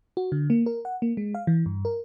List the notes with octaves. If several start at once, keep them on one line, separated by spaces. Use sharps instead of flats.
F#4
D3
A#3
A#4
F#5
A#3
G#3
F5
E3
G2
A#4